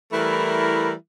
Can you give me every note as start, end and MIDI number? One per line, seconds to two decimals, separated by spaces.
0.11 0.92 52
0.11 0.92 55
0.11 0.92 57
0.11 0.92 64
0.11 0.92 70